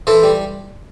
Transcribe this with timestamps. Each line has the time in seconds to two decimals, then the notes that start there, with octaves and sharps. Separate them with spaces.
0.07 E3 A4 C5
0.23 G3